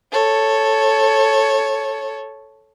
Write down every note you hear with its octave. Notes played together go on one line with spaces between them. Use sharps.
A4 C#5